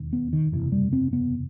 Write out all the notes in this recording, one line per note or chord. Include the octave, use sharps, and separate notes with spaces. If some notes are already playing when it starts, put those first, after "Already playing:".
Already playing: E1 D#2
B3
D#3
F#1 E2 C3 E3
G3
C4
B3